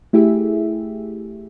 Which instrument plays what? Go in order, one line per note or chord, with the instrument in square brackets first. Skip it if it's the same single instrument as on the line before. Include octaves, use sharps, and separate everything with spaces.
[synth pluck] A3 E4 G4 G#4 E5